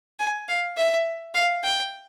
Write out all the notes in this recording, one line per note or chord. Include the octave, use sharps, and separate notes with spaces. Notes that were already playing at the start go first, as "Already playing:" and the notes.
G#5
F5
E5
F5
G5